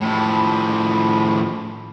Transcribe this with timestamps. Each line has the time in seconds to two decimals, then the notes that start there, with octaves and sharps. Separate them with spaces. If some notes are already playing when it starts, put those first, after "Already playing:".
0.01 A2 F3 B5